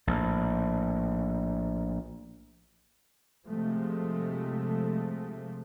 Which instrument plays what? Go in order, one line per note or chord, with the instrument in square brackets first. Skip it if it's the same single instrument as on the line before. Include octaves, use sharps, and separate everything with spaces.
[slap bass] A#1 A2
[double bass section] C3 F3 G#3 A3